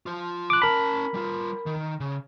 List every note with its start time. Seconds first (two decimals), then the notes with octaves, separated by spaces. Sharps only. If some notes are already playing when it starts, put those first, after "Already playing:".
0.06 F4 C5
0.50 D6 F#6
0.62 C#4 A#4 A5 B5
1.14 G3 F4
1.66 D#3
2.00 C#3